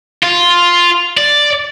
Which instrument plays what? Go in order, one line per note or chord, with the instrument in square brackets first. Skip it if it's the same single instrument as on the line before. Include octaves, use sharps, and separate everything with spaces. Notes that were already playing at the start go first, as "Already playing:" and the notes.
[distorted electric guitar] F4
D5